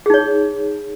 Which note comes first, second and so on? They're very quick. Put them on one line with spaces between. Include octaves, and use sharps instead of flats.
G#4 D#4 C#5